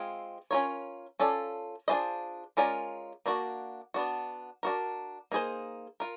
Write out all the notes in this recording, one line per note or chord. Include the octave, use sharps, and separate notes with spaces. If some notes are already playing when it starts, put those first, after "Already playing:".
Already playing: G#3 C4 F4 G#4
C#4 F4 A#4 C#5
C#4 F4 A4 D5
D4 F4 G#4 C5 D#5
G#3 C#4 F4 A#4 D5
A#3 D4 F#4
B3 D4 F#4
D4 F#4 A#4
A#3 D#4 G#4 C5
F4 A#4